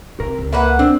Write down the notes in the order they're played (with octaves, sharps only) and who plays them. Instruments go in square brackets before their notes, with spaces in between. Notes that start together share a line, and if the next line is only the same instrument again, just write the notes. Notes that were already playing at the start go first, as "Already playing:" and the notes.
[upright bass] C3 [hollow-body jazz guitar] A#4
[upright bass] C#2
[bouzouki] A#3 B4 F#5 [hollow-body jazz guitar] E5
[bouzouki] C4 [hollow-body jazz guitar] D4